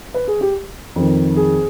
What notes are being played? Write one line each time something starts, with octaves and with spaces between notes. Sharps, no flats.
B4
G#4
G4
F2 D#3
G#4